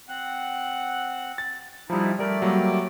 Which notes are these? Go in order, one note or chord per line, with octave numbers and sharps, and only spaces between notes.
C4 F#5
A6
F3 G3 D#4 E4
G3 A3 A#4 D5
F#3 G3 A#3